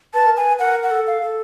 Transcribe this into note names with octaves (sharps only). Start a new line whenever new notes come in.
B4 A5
A#4
B4 G#5
A#4 F#5
F#5
A4
F5
A4